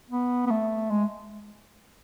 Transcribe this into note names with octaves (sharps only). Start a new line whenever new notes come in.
B3
B3
A3
G#3